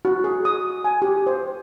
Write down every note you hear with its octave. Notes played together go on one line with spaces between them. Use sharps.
F#4
G#4
D#6
G#5
G4
C5